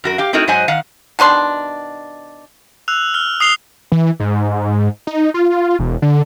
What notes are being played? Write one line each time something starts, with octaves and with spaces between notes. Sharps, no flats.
F#2 F#4 A#4
G4 F5
A3 C4 D#4 E4 F#4 A#4
G#2 F#3 C5 D#5 F#5 G#5
D#3 F5 F#5
B2 D#3 D4 C6
E6 F#6 F7
F6
D#6 C7 F7 G7
E3
G#2
D#4
F4
E1
D3